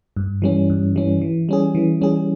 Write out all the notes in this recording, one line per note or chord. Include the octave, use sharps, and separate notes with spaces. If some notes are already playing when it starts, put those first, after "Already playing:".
G2
E3 G3 C#4
G2
E3 G3 C#4
E3
G3 C#4 G#4
E3
G3 C#4 G#4